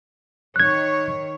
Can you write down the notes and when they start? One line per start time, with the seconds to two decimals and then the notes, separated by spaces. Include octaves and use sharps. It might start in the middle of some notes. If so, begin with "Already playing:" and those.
0.56 D#3 C#5 F#6 G#6